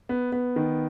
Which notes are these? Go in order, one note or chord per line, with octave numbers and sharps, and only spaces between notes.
B3
B3
D#3